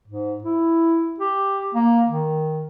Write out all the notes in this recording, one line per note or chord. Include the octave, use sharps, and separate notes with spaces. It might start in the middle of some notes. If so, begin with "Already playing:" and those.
G#2
E4
G4
A#3
D#3